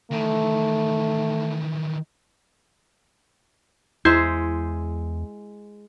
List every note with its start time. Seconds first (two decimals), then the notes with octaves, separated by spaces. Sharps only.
0.12 D#3 E3 A3
4.05 E2 G#3 E4 C5 E5 G6 G#6 C7